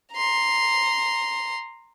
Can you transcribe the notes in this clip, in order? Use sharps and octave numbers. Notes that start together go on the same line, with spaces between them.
A#5 C6